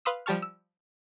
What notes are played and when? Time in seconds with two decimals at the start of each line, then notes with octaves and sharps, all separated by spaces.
0.05 B4 F5 B5 C6 D#6 E6
0.26 F3 G3 G4 A5 C#6 F6
0.42 E6